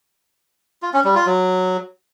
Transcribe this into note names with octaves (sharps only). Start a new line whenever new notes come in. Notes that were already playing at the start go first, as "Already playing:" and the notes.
F4
C#4
G3
F4
F#3